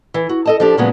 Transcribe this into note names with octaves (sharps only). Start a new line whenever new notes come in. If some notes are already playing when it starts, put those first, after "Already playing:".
E3
F#4
A4 D#5 A5
F3 D4 G4
A#2 C#3 F3 F#3 G#3 B3